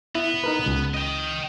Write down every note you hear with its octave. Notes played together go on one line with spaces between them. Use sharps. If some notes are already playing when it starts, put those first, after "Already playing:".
B3 E4
D#4 A#4 B4
C#2
D#5 G5